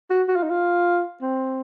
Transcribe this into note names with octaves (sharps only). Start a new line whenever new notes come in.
F#4
F#4
F4
D#4
F4
C4